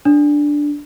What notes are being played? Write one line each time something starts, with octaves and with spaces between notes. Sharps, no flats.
D4